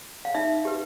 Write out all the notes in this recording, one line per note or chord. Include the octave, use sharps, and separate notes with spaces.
F5
D#4 E5
G4 B4